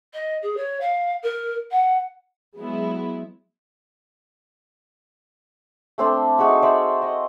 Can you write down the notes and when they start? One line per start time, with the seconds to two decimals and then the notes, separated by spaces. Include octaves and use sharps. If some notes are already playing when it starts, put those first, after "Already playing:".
0.13 D#5
0.42 G#4
0.57 C#5
0.80 F5
1.22 A#4
1.71 F#5
2.57 F#3 G#3 B3 E4
5.98 A3 C4 D4
6.38 D#4 F#4 G#4 E5
6.62 C5 D5 E5
7.02 D#5